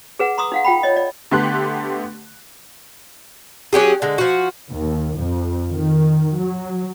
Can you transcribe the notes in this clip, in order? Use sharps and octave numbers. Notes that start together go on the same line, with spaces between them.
G#4 B4 F#5
A#5 C6 D#6 E6
D#4 F5 F#5
F4 G5 B5
C#5 D#5
D5
D3 A3 B3 G4 C6 F#6
F#3 C#4 G4 G#4
D3 G#3
F3 F#4
D#2
F2
D#3
F#3